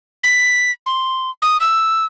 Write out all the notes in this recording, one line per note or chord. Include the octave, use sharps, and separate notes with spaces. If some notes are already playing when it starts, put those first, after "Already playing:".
B6
C6
D#6
E6